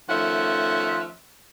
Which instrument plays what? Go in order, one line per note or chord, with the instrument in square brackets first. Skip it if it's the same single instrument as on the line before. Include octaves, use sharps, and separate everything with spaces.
[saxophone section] D#3 F3 A3 C#4 E5 F#5